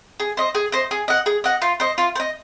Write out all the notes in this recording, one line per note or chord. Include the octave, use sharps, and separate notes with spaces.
G#4
C5 D#5
G#4
C5 D#5
G#4
D#5 F#5
G#4
D#5 F#5
F4
C5 D#5
F4
C5
D#5